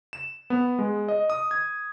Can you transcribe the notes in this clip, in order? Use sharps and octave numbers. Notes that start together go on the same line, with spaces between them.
E7
B3
G#3
D#5
D#6
G#6